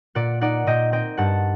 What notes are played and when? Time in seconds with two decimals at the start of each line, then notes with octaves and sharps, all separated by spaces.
0.15 A#2 D5 F#5
0.41 D#4 D5 F#5
0.67 A#2 D#5 G5
0.92 C4 D#5 G5
1.17 G2 F#5 A5